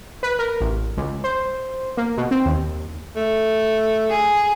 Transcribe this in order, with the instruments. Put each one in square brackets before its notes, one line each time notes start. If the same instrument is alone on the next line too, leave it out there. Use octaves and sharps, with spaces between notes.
[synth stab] B4
A#4
A1
C#2
C5
A#3
B2
C4
D#2
[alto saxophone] A3
[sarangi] G#4